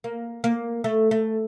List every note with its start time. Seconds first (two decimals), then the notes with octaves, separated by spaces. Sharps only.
0.04 A#3
0.44 A#3
0.84 A3
1.11 A3